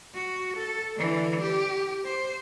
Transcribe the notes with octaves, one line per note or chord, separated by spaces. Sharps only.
F#4
A4
D3 E3
G4
C5